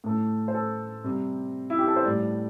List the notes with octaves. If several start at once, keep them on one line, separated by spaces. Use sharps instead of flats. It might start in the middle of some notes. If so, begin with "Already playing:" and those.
A2 A3
C5
A4
C3 G3
E4
G4
A4
C5
A2 G3 D5